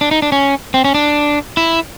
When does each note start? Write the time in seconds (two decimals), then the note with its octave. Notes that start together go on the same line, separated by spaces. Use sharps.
0.01 D4
0.11 D#4
0.22 D4
0.32 C#4
0.74 C4
0.84 C#4
0.95 D4
1.57 E4